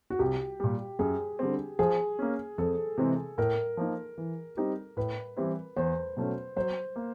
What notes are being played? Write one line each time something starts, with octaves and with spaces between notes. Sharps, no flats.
F#4
C2 G4
A#2 G3
F#2 G#4
D3 G3 C4
F3 G#4
A#3 C#4
F2 A4
C3 E3 G#3 C4
A2 A#4
F3 A#3 D#4
E3
G3 C4 D#4 G4
A2 B4
E3 G3 C4 E4
E2 C5
B2 F#3 A3 C#4
F#3 C5
A#3